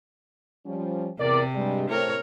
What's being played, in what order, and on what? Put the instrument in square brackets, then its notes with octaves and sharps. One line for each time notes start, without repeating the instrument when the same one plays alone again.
[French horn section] F3 G3 C#4
[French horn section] E2 A#4 D5 [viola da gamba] C3
[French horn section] G2 G3 G#3
[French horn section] A3 C4 E4 [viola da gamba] A#4 C#5